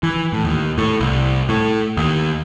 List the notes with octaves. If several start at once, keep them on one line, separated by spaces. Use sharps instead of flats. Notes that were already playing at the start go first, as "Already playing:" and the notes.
E3
A2
D#2
A2
C2
A2
D#2